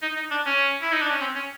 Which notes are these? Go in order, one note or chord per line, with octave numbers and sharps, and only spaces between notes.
D#4
D#4
D4
C#4
E4
D#4
D4
C#4
C4
C#4